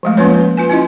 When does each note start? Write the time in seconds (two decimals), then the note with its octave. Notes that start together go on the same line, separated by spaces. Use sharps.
0.03 F3 G#3 A3
0.17 F3 A#3 C#4 F4 B4 C#5
0.34 B4
0.57 F4 B4 G#5
0.70 C#4 E4 F4 D#5